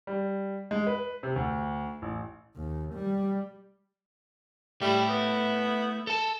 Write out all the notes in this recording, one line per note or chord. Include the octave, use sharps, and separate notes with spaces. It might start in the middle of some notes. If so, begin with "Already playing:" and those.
G3
G#3
B4
C3
D2
A1
D#2
G3
G3 A3 E4
B3
A4 A5